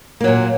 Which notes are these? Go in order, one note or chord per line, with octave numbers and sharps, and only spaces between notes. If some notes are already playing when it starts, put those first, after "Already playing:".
A#2 F#3 A#3